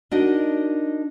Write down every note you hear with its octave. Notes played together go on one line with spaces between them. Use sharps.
D4 D#4 F#4 A#4 D5 D#5